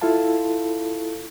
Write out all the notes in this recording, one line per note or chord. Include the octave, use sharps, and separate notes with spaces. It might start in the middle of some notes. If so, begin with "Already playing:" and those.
E4 F4 A4 F5 A5